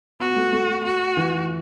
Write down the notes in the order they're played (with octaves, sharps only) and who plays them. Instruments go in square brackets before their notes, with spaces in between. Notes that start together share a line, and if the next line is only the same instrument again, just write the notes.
[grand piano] B3 [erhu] F#4
[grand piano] B3
A3
A3
[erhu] F#4
[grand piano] E3